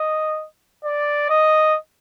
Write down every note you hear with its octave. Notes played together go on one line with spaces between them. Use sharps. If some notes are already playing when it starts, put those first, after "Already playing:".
Already playing: D#5
D5
D#5